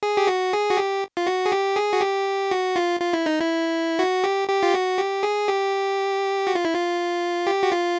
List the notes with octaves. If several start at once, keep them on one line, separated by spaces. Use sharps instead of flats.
G#4
G4
F#4
G#4
F#4
G4
F4
F#4
G#4
G4
G#4
F#4
G4
F#4
F4
F4
E4
D#4
E4
F#4
G4
G4
F4
F#4
G4
G#4
G4
F#4
F4
E4
F4
G4
F#4
F4